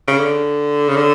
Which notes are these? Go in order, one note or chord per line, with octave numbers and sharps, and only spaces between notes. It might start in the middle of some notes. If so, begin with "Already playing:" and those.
C#3
D3
C#3
D3